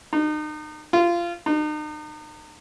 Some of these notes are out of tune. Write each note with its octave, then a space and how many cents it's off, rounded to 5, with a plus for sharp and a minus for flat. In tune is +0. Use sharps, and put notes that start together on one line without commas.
D#4 -35
F4 -20
D#4 -40